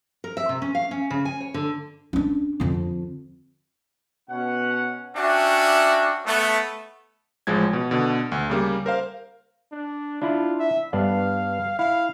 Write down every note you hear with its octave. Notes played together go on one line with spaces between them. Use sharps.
A#4
E5
C3
C#4
F5
C#4
C#3
G#5
C#5
D3
C#4 D4
F2 D3
B2 C#4 F#5
C#4 D4 F#4 E5 G5
A3 B3
A1 F3 G#3 G#6
B2
B2 D3
D2
C#3 G3 A#3
A#4 C5 F5
D4
D4 E4 F4
E5
G2 B3 D4 F5
E4 F5